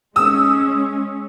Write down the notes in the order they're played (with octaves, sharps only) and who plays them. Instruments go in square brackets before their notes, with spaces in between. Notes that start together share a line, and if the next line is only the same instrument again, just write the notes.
[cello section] G#3 C#4 [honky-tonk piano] D#6 E6